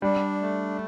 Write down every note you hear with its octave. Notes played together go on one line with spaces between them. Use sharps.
G3 D4
A3